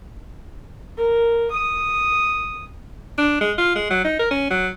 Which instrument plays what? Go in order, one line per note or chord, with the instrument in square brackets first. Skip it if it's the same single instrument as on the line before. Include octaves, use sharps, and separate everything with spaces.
[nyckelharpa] A#4
D#6
[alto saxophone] D4
G#3
F4
G#3
F#3
D#4
A#4
C#4
F#3